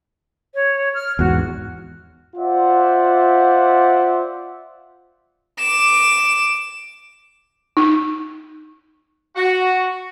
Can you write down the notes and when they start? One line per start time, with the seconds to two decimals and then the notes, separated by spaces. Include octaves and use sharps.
0.54 C#5
0.94 F6
1.19 E2 G#2 F#4
2.36 F4 C5 D5 E5 F#5
5.59 D6 E7
7.77 D#4
9.36 F#4